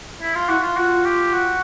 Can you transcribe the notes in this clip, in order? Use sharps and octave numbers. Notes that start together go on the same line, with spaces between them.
E4
F4
E4 F#4
F4
F4 F#4
G4
F#4